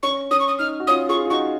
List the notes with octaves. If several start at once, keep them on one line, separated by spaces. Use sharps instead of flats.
C#4 C#6
C#4 D#6
C#6
D#6
D#4 F6
F#4
C#4 F4 D#6
F4 G#4 C#6
F4
D#4 F#4 C#6